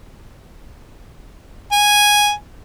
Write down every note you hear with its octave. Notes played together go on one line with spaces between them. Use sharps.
G#5